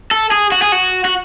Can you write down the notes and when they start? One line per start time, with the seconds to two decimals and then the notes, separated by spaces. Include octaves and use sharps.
0.11 A4
0.32 G#4
0.52 F#4
0.62 G#4
0.72 F#4
1.05 F#4